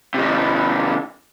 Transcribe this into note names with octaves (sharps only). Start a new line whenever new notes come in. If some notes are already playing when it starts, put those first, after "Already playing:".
C3 D#3